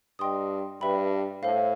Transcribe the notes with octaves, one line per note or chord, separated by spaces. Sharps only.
G2 D#5 G5 C6 D#6
G2 B4 E5 G5 B5
A2 A4 C5 F5